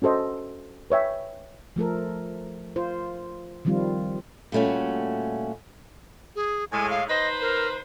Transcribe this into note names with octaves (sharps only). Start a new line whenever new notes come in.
C#4 F#4 A4 C5 D#5
B4 C#5 E5 G5
F3 A3 A4 A#4
F4 C5
D#3 F3 G3 C4 F4
A#2 G3 A3 C#4 F#4
G#4
A2 G#3 G#5
F5
D#4 B4 C5 D#5
A#4